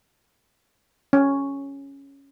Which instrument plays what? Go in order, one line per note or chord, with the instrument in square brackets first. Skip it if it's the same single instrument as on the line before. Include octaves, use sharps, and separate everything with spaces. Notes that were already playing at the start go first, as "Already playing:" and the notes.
[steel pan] C#4